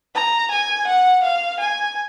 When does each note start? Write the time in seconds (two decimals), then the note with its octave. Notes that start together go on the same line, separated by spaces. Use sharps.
0.15 A#5
0.51 G#5
0.87 F#5
1.23 F5
1.59 G#5